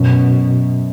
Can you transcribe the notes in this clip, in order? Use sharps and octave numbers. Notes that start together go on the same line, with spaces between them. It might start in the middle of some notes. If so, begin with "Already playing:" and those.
Already playing: F#2 B2